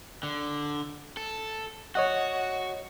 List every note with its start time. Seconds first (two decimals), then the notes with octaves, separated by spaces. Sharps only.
0.23 D3
1.17 A4
1.95 F#4 C#5 D#5 F#5